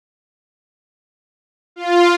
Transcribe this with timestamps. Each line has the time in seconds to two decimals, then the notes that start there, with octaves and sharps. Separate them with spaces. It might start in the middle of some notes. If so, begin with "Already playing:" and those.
1.76 F4